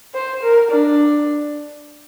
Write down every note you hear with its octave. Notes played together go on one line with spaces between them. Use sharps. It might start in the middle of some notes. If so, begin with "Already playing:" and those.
C5
A#4
D4